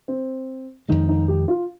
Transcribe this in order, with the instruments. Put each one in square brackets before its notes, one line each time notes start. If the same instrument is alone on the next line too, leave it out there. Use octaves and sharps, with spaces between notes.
[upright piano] C4
[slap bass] F2 D#3 G#3 [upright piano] D#4
[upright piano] D#4
G4
F4